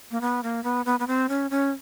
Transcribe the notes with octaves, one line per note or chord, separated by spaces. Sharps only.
A#3
B3
A#3
B3
B3
B3
C4
C#4
C#4